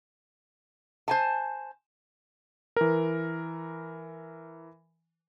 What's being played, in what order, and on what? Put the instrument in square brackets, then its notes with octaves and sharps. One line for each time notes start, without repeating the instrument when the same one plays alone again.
[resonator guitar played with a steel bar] C5 G#5 A5
[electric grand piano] E3 A#4